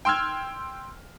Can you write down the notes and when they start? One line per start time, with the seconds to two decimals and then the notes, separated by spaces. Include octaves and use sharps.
0.05 G5 C6 E6 F6 G#6